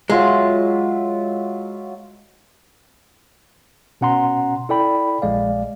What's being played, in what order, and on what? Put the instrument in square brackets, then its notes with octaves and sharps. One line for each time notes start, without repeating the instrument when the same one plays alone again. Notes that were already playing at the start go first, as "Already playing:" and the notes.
[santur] F#3 F4 E5 [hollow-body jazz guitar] G#3
[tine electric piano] B2 C#4 F#5 A#5 C6
E4 A4 D5 G5 B5
A#1 G#3 D5 F5